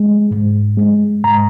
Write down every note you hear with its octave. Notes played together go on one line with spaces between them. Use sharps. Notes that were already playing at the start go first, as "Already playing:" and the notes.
Already playing: G#3
G#2
G#3
G#2 A#5